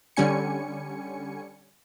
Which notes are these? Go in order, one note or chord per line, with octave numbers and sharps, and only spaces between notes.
D3 G3 C#4 G#5 C#7